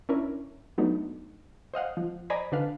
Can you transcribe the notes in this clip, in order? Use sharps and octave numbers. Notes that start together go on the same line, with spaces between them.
C#4 D4 E4 A#4
F#3 A3 B3 D4 D#4
C5 D#5 F5 F#5
F3
C5 D5 D#5 G#5 A#5 B5
D3 D4 B4 F5